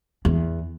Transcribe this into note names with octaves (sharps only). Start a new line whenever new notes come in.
E2